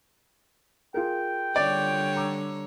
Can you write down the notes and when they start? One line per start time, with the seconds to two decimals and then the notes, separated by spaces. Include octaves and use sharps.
0.94 F4 G#4 A#4 G5
1.56 D3 G3 C#5 D5
2.16 A#5 D6 E6